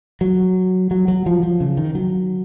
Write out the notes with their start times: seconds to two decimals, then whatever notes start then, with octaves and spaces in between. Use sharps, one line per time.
0.21 F#3
0.91 F#3
1.08 F#3
1.26 F3
1.43 F3
1.60 C#3
1.77 D#3
1.95 F#3